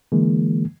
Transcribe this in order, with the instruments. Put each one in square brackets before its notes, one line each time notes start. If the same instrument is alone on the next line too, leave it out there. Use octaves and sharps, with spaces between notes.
[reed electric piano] D3 E3 G#3 A#3